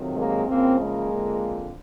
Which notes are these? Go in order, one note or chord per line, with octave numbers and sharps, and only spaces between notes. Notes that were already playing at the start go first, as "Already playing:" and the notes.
Already playing: F2 C3 D#3 F#3
G#3 A#3
F#2 C#3 F3 A#3 C4
G#3 A#3
F2 D3 F3